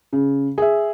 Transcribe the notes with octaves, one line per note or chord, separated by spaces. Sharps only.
C#3
G#4 E5